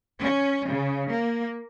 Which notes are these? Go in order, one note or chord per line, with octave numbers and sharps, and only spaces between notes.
C#4
C#3
A#3